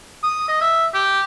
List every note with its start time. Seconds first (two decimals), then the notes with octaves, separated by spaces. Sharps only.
0.23 D#6
0.48 D#5
0.61 E5
0.94 G4